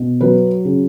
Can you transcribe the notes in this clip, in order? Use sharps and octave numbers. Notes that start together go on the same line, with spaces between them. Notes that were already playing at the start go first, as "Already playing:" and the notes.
Already playing: B2
F#3 B4
C#3